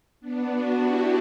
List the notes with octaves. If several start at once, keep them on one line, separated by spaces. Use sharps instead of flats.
B3 D4
D4 F#4
E4 G4